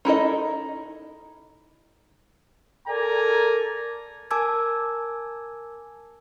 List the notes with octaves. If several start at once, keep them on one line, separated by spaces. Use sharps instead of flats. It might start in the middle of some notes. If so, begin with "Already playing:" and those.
D#4 E4 A4 D#5
A4 A#4 D5 G#5 A#5
A#4 G#5 A5 D6 E6 G#6